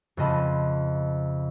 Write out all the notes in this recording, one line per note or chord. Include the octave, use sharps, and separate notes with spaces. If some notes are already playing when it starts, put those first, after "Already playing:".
F2 C#3 C4 D#5 A5 B5